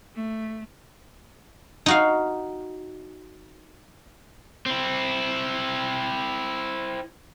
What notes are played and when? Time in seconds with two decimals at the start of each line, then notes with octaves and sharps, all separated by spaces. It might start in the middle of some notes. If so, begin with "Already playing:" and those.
0.15 A3
1.86 D#4 F#4 F5
4.66 C4 E4